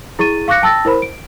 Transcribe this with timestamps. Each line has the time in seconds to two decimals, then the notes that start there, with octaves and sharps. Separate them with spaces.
0.19 E4 G#4 C#6 A6 D#7
0.48 F5 C#6 D6 F#6 A#6 C#7
0.62 G5 A5 E6 A6 A#6
0.85 E4 A#4 C5 B5
1.02 D7